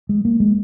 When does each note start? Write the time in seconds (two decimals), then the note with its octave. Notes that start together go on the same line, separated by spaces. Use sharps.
0.09 G#3
0.25 A#3
0.40 G#3